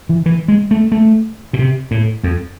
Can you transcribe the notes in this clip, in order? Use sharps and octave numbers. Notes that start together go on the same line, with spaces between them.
E3
E3
G#3
A3
A3
B2
C3
A2
F2